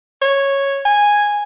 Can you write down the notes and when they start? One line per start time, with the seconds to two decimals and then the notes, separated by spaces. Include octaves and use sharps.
0.22 C#5
0.85 G#5